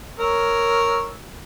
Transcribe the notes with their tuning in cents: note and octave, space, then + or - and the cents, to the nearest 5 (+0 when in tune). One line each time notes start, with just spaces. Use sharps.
A#4 +0 C#5 +0 E6 -5